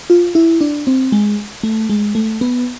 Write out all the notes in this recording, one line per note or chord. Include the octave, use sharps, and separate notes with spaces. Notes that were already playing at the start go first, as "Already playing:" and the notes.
F4
E4
D4
C4
G#3
A3
G#3
A3
B3